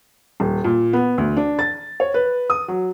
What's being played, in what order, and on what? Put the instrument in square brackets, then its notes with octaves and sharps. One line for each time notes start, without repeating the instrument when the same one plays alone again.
[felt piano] D#1
A#2
B3
D2
D4
A6
C#5
B4
D#6
F#3